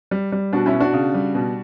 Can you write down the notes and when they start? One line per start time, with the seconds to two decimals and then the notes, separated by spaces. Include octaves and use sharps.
0.11 G3
0.32 G3
0.53 B2 D4 F#4
0.66 C#4 E4
0.73 B2
0.80 D4 F#4
0.93 C#3
1.14 G3
1.35 B2